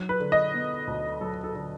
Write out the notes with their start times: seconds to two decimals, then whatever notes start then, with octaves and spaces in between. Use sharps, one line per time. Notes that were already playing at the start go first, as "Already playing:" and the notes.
Already playing: F#3
0.09 B4
0.20 D3
0.32 D#5
0.54 B3
0.87 D2
1.21 F#3 A4
1.44 A4
1.55 D3